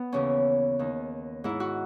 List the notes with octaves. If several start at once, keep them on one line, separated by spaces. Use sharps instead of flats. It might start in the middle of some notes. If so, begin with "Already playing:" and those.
Already playing: B3
D#2 C#3 E3 C#4
D#2 D#3
G#2 D#3 E4
F#4